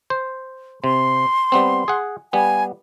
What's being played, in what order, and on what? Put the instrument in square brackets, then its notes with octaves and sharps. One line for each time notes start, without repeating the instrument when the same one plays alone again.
[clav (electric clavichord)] C5
[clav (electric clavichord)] C3 [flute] C6
[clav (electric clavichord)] G3 B3 C4
G#4 F#5
[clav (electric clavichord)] G3 B3 [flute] G#5